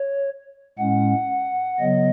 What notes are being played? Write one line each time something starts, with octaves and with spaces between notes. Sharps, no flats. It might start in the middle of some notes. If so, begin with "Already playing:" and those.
Already playing: C#5
A2 G#3 C#4 F#5
C#3 F#3 B3 D#5